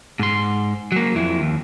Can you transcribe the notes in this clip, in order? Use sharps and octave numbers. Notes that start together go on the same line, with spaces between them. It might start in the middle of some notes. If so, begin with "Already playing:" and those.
G#2 C6
F#3 A#3
F2 E4
D#2